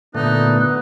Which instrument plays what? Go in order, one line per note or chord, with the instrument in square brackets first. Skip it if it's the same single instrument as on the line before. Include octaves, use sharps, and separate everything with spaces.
[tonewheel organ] A#2 D3 A3 [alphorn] B3 [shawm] D#4 [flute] F#6